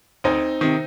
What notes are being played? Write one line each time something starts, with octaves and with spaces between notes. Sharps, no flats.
D2 C4 D#4
C3 D#3